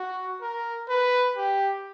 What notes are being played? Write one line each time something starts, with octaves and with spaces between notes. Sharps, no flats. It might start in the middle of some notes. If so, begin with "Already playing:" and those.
Already playing: F#4
A#4
B4
G4